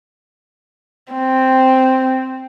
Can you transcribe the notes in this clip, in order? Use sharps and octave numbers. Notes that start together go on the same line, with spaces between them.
C4